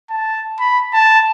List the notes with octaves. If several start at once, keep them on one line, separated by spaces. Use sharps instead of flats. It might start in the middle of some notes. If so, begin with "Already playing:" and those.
A5
B5
A5